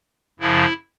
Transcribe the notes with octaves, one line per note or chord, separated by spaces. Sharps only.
F#2 C#3 F3 E4